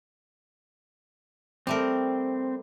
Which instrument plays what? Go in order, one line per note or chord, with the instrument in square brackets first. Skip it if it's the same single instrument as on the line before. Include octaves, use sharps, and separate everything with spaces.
[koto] G3 A3 A#4 [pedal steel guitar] C4